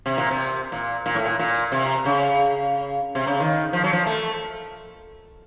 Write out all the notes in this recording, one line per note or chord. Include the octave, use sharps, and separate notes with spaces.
C3
A#2
C3
A#2
A#2
A2
A#2
A#2
C3
C#3
C3
C#3
D#3
F3
F#3
F3
A3